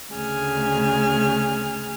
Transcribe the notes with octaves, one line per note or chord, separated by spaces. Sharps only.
D2 C#3 A3 G#4 G#5 F6